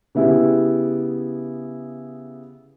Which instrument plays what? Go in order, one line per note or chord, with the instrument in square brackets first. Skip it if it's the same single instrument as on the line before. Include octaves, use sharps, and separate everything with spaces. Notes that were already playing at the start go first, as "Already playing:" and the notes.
[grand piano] C#3 B3 E4 G4 G#4